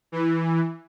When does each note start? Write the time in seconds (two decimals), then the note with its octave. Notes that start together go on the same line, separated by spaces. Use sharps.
0.12 E3